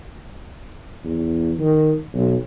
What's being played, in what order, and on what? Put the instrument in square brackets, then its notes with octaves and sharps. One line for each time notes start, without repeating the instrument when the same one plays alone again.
[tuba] E2
D#3
B1